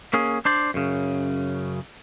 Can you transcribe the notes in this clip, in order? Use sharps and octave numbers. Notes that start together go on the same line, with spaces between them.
A#3 C#4 G#4
D4 C5 D5
F#2 C#3